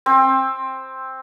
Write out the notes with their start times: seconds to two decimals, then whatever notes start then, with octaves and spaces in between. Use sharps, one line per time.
0.06 C4